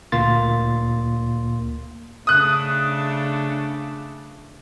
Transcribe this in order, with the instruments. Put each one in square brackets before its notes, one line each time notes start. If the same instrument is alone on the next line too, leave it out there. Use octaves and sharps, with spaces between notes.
[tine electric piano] D2 A#2 A#3 C6 A6
[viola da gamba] C#3 A3 D4 [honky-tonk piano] D#6 F#6